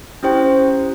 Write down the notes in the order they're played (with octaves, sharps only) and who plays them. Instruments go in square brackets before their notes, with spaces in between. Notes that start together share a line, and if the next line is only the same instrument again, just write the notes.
[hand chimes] C#4 E4 G4 C5 G5